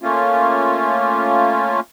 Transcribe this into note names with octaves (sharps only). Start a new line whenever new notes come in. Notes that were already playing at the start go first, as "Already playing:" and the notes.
A3 A#3 C#4 F4